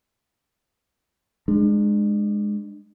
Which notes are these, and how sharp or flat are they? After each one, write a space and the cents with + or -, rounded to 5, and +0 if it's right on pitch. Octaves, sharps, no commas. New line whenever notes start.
G#3 +0 D4 +35